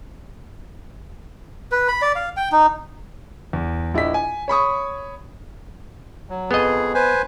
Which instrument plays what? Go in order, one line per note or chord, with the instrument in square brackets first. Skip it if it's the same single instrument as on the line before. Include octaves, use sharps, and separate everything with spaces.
[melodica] B4
B5
D5
F5
G5
D#4
[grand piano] E2
A#1 E4 D#5 B6
G#5
C#5 B5 C#6 D#6
[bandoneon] F#3
[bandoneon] F2 G#4 [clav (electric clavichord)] B3 D#5
[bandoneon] B4 C5 G#5